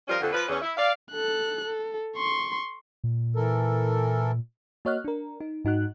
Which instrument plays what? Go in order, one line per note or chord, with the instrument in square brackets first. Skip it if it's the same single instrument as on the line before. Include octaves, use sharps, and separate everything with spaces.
[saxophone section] F3 G3 C#4 F4 A#4
F2 D3
F3 B4
E2 C#4
E4
D5 F5
[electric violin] A4 F#6
A4
C6 C#6
[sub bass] A#2
[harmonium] E3 A4 A#4
[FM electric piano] A#3 F#4 C#5 D#5 F6 F#6
D4 A#4
D#4
G#2 D#4 F#4 F#6